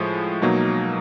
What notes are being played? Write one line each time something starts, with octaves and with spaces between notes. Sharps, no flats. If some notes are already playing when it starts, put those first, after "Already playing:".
Already playing: A2 F3 G#3
B2 F#3 A#3 D#4